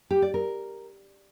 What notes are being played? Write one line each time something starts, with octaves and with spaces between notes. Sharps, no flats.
G4
D5
A#4